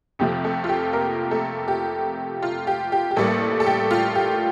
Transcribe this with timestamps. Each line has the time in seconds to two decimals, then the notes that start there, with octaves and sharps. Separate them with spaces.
0.19 F2 C3 F3 A3 G4
0.44 A3 A4
0.64 F4
0.69 G4
0.93 A#3 A#4
1.31 A3 A4
1.68 G4
2.42 F4
2.67 G4
2.92 G4
3.11 G4
3.16 A1 A2 G3 A3 A#3 A4
3.60 A4
3.66 G4
3.91 F4
4.15 G4